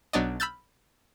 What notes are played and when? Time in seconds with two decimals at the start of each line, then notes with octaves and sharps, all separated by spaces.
0.13 B1 F#3 B3 D4 D5 D#5
0.40 B5 E6 F6 G6 A6